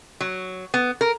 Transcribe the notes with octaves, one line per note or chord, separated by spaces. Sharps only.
F#3
B3
A#4